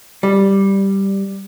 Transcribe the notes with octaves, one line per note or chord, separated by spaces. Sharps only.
G3